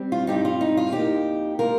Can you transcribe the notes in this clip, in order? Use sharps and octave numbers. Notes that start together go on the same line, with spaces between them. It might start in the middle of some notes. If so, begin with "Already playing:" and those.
Already playing: G3 C4
F4
G2 G3 C4 D#4 G4
F4
D#4
F4
F2 F3 A#3 D#4 G4
F3 A#3 F4 A#4